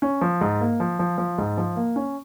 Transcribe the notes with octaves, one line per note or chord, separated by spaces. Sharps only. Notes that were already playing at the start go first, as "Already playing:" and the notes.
C#4
F3
G#2
A#3
F3
F3
F3
G#2
F3
A#3
C#4